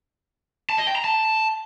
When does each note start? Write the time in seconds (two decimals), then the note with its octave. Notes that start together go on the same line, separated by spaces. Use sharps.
0.70 A5
0.78 D#5
0.87 G5
0.96 A#5
1.04 A5